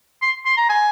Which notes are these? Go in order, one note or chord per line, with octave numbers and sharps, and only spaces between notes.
C6
C6
A#5
G#5